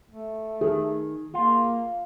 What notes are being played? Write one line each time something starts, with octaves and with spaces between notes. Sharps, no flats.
A3
D#3 G#4
A#3 F4